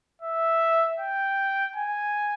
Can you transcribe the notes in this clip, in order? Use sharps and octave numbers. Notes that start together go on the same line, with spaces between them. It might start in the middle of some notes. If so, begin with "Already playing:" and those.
E5
G5
G#5